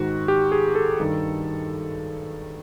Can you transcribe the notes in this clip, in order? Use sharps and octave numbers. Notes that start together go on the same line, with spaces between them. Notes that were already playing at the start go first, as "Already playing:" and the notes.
Already playing: G#2 D#3 F#4
G4
G#4
A4
G2 D#3